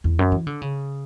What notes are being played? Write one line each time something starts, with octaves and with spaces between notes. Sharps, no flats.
E2
F#2
E3
D3
C#3